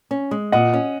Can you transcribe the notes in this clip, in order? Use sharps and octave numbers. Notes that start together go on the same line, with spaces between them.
C#4
G#3
A#2 D#5 F#5
C#4